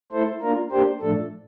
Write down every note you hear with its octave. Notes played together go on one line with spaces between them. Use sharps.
A3 E4 A4 C5
A#3 D4 F4 A#4
A#3 D4 G4 C5
A2 F3 A3 D4 A4